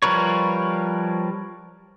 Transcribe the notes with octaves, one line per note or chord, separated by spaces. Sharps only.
F3 G3 A#4 B4 C#5